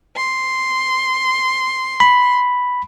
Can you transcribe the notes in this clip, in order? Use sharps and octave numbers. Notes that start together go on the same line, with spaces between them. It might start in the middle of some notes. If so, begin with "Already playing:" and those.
C6
B5